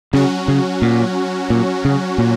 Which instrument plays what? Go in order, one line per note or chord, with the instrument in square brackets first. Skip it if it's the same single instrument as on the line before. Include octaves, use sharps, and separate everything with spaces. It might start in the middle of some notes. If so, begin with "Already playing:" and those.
[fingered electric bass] C#3 [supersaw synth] F#3 C#4 F#4
[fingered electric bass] C#3
A#2
A#2
C#3
A#2